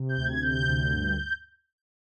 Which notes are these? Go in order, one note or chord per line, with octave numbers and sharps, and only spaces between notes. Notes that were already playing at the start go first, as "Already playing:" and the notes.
Already playing: C3
G6
D2
G#6
C3 G6
D2
G2